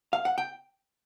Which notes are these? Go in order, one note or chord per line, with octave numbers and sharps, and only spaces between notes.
F5
F#5
G5